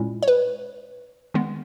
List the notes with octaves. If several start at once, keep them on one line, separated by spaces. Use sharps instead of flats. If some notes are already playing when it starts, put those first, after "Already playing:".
Already playing: A#2 G#3 C#4 E4
C#5
B4
D#3 G#3 B3